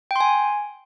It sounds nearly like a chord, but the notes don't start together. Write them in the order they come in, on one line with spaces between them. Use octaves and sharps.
G5 C6 G#5